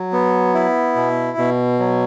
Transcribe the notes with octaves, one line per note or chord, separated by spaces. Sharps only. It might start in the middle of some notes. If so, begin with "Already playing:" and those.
Already playing: F#3
B3
E4
B2
B2
F#3